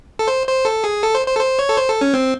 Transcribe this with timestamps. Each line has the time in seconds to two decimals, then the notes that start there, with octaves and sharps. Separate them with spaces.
0.19 A4
0.28 C5
0.47 C5
0.65 A4
0.84 G#4
1.03 A4
1.15 C5
1.27 C5
1.36 A4
1.39 C5
1.59 C#5
1.69 A4
1.77 C5
1.89 A4
2.01 C#4
2.14 C4